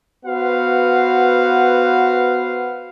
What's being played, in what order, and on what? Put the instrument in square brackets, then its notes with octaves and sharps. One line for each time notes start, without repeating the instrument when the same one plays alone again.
[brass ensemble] B3 F#4 B4 C5 F5 F#5